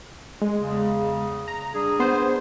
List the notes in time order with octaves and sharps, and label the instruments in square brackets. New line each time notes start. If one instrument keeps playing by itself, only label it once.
[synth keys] G#3
[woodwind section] E2 C#3
[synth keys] A#5
[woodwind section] G3 D4 G#4
[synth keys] B3 C5